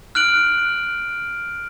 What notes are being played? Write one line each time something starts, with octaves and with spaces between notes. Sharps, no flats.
F6 F#6 D7 F#7